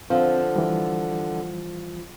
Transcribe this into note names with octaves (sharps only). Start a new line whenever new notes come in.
D3 F3 C4
E3 G3